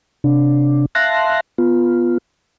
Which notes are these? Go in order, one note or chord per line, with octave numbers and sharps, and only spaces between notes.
C3 D4
E5 F5 A5 C6 F#6 A#6
B3 F4